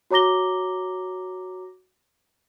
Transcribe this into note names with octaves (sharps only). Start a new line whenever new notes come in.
F#4 C#5 A#5 D6 A#6 G7